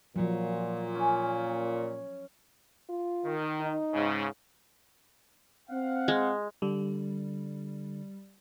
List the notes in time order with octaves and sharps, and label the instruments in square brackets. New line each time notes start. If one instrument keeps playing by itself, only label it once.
[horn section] A#2 [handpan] F3 F#3
[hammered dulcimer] C#4
[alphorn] F4
[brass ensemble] D#3
[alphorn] D#4
[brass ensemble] G#2 C#3
C4 F5 F#5
[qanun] G#3
[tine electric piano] D3 [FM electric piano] G3